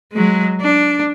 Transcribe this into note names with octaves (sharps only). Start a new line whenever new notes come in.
F#3 G#3
D4